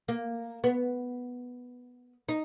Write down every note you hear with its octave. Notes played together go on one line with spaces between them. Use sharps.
A#3
B3
D#4